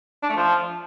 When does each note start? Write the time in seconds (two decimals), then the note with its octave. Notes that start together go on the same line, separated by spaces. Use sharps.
0.23 D4
0.30 A3
0.36 F3